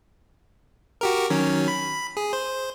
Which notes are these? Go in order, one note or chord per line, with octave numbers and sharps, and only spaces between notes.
F#4 G4 A#4
D#3 F#3 C#4
B5
G#4
C5